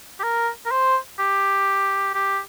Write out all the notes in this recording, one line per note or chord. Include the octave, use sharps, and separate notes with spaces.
G4
A#4
A#4
C5
G4
G4